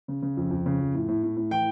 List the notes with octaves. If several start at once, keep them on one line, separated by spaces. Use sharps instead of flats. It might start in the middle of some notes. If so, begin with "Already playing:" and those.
C#3
C#3
F2
F2
C#3
F2
A2
A2
A2
A2
E3 G5